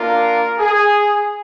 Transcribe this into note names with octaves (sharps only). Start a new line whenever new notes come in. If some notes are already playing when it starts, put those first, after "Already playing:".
Already playing: A#3 D4 F4 A#4
G#4